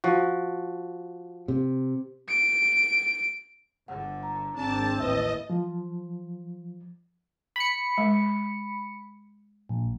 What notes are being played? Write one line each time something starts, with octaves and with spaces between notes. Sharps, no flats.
F3 F#4
C3
D7
G1 D3 F#5
A#5
G#1 C4 D4 A5
A1 D#2 B4 D#5 E5 E6
F3
B5 C#7
G#3
A#1